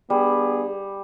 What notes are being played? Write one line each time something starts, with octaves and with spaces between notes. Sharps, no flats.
G3 B3 D4 G#4